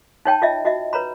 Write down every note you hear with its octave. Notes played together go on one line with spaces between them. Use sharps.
D#4 C#5 G5 A5
F4 D#5 E5
F#4 D#5 E5
B4 C#5 A#5 B5